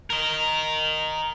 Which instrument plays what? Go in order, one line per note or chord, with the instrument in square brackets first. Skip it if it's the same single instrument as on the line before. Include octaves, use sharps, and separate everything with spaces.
[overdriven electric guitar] A#4 D#5